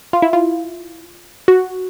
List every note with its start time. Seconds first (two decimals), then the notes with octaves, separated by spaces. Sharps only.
0.13 F4
0.22 E4
0.33 F4
1.48 F#4